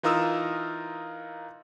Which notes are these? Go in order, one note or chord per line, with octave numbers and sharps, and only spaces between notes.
E3 D#4 F4 A#4 D#6 E6